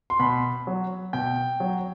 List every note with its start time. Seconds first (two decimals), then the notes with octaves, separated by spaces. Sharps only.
0.10 C6
0.20 B2 B5
0.67 F#3
1.13 B2 G5
1.60 F#3